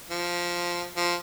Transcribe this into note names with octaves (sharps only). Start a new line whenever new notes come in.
F3
F3